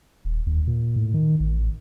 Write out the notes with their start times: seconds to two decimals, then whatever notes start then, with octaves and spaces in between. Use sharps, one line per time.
0.25 D#1
0.46 D#2
0.67 A#2
0.96 A2
1.14 D#3
1.40 A1